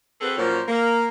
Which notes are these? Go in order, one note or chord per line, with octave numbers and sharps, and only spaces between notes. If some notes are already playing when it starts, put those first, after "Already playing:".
C4 F#4 G#4 A4 B4
A#2 F3 F#3 A#3 C#4 C5
A#3